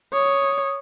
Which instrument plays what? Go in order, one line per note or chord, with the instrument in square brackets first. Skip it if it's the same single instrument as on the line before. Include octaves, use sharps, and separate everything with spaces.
[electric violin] C#5 [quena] D#6